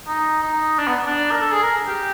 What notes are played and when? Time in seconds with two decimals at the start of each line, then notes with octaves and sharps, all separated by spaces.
0.07 D#4
0.42 D#4
0.78 D4
0.88 B3
1.06 D4
1.31 A#4
1.41 A4
1.51 G#4
1.63 A#4
1.87 G4